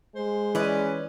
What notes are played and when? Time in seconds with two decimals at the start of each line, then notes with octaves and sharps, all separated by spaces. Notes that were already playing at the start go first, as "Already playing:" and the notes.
0.15 G#3 C5
0.55 E3 C#4 B4 D5 D#5